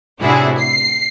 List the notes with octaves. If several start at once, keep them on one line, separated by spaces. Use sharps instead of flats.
A2 C3 D4 E4 F#4 G#4
C7